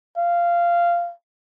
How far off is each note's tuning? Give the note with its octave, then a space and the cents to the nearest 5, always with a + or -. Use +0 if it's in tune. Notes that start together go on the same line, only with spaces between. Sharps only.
F5 -15